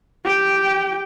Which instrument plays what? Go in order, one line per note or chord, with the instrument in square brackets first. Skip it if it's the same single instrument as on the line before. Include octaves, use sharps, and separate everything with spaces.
[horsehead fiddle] G4 G5